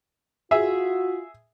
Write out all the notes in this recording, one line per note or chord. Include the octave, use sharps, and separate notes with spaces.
F4 F#4 G#4 E5